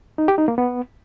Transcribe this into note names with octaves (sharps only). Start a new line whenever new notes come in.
D#4
G4
D#4
A#3
B3